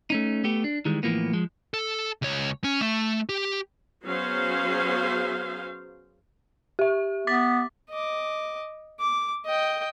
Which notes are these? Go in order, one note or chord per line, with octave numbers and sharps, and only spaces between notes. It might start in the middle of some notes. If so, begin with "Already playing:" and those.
A3 C#4 D#4
A3 B3 G4
D4
D#3 E3 G3 G#3
A2 E3 F3 A#3 B3
F3 G#3
A4
C#2 C#5
C#4
A3
G4
F#3 B3 C#4 G#4 C5 F5
G4 E5
B3 D6 A6 B6
D#5 D6
D6
D#5 G5